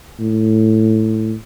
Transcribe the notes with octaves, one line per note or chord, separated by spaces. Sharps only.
A2